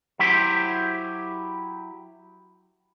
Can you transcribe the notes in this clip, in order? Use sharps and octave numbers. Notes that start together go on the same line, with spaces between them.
F#3 E4 G4 C5